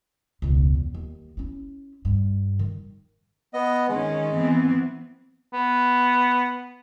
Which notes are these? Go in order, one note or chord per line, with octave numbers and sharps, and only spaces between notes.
E1 C#2
E2
D#2
C#4 E4
G2
D#3
B3 D#5
D#3 G#3 C#4
E3 B3 C4
B3